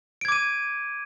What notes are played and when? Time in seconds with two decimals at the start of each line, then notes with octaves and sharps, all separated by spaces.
0.21 D7
0.25 G#6
0.28 D6
0.32 D#7